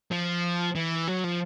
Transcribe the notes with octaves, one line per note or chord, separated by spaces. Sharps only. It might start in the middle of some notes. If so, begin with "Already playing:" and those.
F3
E3
F#3
F3